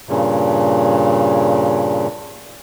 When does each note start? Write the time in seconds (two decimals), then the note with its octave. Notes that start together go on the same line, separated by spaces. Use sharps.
0.09 G2 A#2 C#3